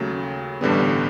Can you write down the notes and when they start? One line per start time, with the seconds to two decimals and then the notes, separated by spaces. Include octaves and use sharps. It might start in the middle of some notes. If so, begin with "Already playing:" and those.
Already playing: D#2 C#3 F#3 A3
0.61 A1 G2 D3 G3 B3